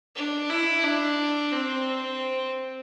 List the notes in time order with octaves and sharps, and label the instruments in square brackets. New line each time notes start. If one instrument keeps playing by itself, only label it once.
[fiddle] D4
E4
D4
C4